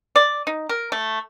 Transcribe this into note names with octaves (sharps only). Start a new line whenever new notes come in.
D5
D#4
A#4
A3